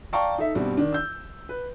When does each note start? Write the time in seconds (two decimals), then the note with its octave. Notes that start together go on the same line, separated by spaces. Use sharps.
0.13 D5 F5 G5 A5 A#5 C#6
0.38 D#4 A4 E5
0.55 G2 B2 G3 C4
0.77 D#3 D4
0.93 E6 G6
1.49 B4